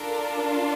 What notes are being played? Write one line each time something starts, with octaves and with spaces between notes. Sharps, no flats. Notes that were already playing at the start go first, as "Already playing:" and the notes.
Already playing: D4 F4 A4 A#4